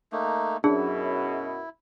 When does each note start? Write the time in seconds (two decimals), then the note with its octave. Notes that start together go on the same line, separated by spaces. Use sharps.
0.12 A3 A#3 D#4
0.64 F#2 B2 D4 E4 G#4